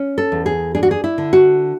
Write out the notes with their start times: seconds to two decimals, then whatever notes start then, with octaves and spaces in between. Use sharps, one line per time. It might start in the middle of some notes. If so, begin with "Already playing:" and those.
Already playing: C#4
0.18 A4
0.32 E2
0.46 G#4
0.75 D4 G#4
0.83 F#4
0.91 G#4
1.04 E4
1.18 D3
1.33 F#4